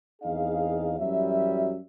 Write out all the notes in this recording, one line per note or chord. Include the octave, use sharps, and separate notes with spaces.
E2 C4 D#4 G#4 D#5 F5
F#2 E3 F#3 G3 E5